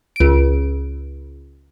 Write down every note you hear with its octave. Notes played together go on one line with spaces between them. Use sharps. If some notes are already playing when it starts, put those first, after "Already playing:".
C#2 D7